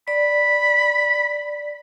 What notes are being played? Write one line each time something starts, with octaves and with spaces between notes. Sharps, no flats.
D5 B5